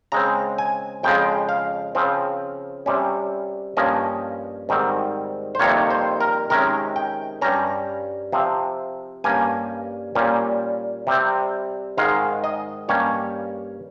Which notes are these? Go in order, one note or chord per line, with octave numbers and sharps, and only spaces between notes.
C#3 G#3 C4 A#5
G#5
F2 C#3 F3 G#3 G5
F5
C#3 F3 C4
C3 G3 C#4
G2 F3 A#3 C#4 D#5
G#2 D#3 G3 C4
C5
F2 C3 D#3 G3 A#3 C#5
C5
A#4
C3 D#3 G#3 C#4 A#4
G5
G2 G3 C#4 A#5
C3 F3 C4
G2 G3 A#3 C#4 G#5
A#2 G3 A#3 C#4
C3 G3 C4
G#2 D#3 G#3 F5
D#5
G2 G3 A#3 C#4 C#5